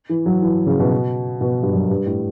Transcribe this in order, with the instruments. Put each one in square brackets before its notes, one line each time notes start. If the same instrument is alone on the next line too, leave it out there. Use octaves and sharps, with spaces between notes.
[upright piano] E3
F#3
E3
C#3
B2
B2
G2
F#2
G2
A2